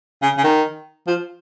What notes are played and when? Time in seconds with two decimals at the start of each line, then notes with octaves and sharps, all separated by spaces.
0.23 C#3
0.38 C#3
0.44 D#3
1.07 F3